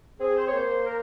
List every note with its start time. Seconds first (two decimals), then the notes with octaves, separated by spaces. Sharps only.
0.20 C4 G#4
0.36 C5
0.47 C#5
0.52 A#3 C5
0.85 A#4